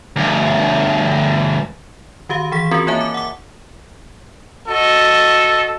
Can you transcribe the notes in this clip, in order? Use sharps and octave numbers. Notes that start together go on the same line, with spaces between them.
D2 G2
D#3 F#4 G4 F5
E3 G#4 B6
C4 C#4 F4 F#4 G#4 A#4
A#3 F4 C#5 E5 G#5 A5
D6
F#5 D6
F#4 A4 D#5